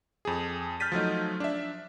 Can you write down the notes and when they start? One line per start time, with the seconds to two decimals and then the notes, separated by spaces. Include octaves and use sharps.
0.25 F2 G#4
0.80 F6 G6 A6 B6 D#7
0.92 F3 F#3 A3 D#4
1.40 D4 E5